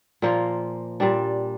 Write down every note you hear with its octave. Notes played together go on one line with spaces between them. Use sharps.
A#2 F3 A#3 F4
A#2 G3 D4